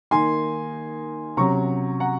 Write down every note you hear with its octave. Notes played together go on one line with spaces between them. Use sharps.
D#3 A#3 D#4 G#5 C6
C3 F#3 C#4 A#5 C#6
F#5 A#5